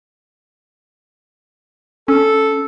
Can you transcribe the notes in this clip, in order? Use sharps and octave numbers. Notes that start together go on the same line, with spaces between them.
C#4 A4